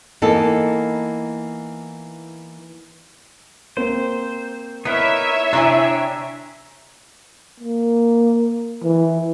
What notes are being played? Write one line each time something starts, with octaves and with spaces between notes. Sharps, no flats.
E3 A#3 B3 D#4 A4
A#3 C4 C5
B3 D#4 E4 A#4 C#5 E5
C3 D4 E4 G4 G#5 A#5
A#3
E3